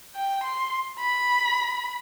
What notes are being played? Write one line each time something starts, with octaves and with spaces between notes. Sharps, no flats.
G5
C6
B5